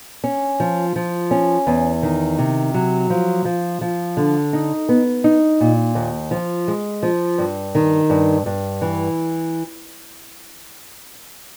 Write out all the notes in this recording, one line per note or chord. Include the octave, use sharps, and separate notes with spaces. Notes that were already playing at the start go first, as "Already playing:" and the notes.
C#4
F3
F3
C#4
E2
D#3
C3
F#3
F3
F3
F3
D3
D#4
B3
D#4
A#2
D#2
F3
G#3
F3
G2
D#3
G2
G2
E3